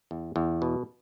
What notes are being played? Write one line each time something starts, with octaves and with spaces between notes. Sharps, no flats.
E2
E2
B2